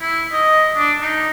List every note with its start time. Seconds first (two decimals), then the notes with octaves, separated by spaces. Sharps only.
0.01 E4
0.32 D#5
0.77 D4
1.01 D#4